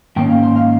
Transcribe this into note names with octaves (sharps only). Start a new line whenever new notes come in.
G#2 D#3 A#3 C#4 G5
F5
C5
F5